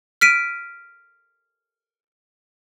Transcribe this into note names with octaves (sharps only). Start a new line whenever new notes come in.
F6 B6 D7 D#7